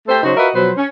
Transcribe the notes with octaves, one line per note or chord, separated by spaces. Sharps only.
A3 G4 A4 C5
C#3 F#3 D#4 F#4 C5
F4 F#4 A#4 B4 D#5 E5
B2 F3 F#3 B4 C5
C#4